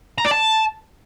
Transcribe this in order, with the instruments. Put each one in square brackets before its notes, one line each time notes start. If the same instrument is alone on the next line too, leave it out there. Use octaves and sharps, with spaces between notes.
[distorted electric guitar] A#5
D5
A5